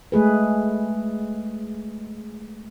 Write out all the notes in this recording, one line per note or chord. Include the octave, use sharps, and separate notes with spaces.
G#3 A3 G#4 B4